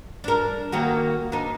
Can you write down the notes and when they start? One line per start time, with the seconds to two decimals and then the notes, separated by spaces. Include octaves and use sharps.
0.24 D4 A#4
0.72 D#3 A#3 F#4
1.32 D4 D#4